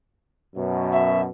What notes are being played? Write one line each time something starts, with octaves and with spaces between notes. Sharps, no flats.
F#2 B2
E5